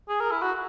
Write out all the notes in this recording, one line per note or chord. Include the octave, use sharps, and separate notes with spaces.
G#4
A#4
E4
F#4